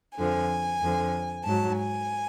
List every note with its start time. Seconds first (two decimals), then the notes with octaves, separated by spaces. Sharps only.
0.18 F2 D3 F3 G#5
0.81 F2 D3 F3
1.45 G#2 F#3 A5
1.78 G#5